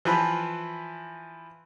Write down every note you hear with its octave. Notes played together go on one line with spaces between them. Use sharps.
E3 F3 B4